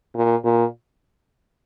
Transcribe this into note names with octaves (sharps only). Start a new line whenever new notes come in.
A#2
A#2